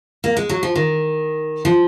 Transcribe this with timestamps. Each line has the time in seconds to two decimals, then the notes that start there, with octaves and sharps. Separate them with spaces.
0.24 A#3
0.37 G#3
0.49 F#3
0.63 F3
0.75 D#3
1.65 F3